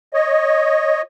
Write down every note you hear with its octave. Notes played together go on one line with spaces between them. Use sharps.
C#5 D#5